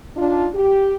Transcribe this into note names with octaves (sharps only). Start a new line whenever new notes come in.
D4 D#4 F4
G4